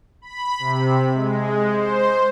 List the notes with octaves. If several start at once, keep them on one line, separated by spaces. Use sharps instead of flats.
B5
C3
G#3
C5